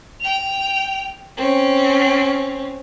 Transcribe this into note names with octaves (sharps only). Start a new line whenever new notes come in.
G5 F7
C4 C#4